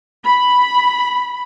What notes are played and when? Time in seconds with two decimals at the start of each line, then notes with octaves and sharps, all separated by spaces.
0.24 B5